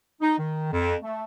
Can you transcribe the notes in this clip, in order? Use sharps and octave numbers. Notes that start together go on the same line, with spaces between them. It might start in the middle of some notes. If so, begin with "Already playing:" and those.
D#4
D#3
F2
A3